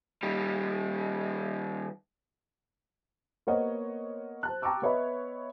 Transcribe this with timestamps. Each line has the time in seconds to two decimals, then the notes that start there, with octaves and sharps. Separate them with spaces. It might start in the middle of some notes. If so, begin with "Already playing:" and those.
0.23 D#3 G3
3.47 A#3 B3 C5 C#5 D#5 F#5
4.43 C5 A5 F#6
4.62 G5 A5 A#5 C#6 D6 E6
4.82 B3 B4 C#5 D#5 E5 B5